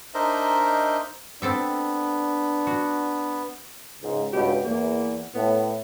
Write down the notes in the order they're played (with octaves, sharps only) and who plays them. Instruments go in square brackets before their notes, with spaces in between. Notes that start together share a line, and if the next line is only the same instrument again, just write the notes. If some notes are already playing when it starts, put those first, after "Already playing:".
[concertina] D4 D#4 A#4 C5 D#5 E5
[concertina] B3 [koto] C4 A4 E5 [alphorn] D4
[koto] F#4
[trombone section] C#2 G#2
[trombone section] C#2 G2 B2 [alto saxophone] G4
[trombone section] E2 [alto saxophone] A#3
[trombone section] A2 [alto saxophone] B3